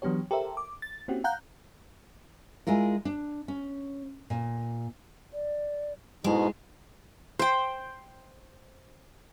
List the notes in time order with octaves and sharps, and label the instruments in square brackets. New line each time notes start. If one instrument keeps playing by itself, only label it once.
[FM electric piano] E3 F#3 B3 D4 G4 C#5
G4 A4 A#4 C5 E5
D6
A6
A#3 C4 C#4 E4 F#4 G4
F5 F#5 A#5 F#6 G6
[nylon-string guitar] G#3 E4 F4 A#4
D4
C#4
A#2
[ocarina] D5
[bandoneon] G#2 B2 [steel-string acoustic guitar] G#3 [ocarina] E4
[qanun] C5 G5